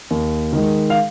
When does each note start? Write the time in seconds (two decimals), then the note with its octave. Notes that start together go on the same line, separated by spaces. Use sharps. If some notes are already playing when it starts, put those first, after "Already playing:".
0.11 D#2
0.53 D#3 G#3
0.90 F5